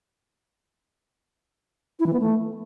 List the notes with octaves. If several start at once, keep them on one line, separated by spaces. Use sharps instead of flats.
E4
E3
B3
A3